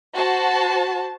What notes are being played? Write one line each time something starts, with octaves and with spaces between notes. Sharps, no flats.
F#4 C5 A5